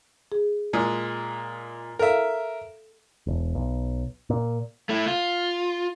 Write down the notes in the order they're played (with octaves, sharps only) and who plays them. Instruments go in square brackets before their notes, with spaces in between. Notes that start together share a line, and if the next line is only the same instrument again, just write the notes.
[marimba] G#4
[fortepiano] A#2 G#3
[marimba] A4 F5 [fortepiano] A#4 E5
[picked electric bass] E1
B1
A#2
[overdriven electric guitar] A3 E4
F4